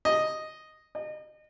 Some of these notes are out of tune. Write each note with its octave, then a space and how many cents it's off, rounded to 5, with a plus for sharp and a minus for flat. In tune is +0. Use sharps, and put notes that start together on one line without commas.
D#5 +0
D#5 -30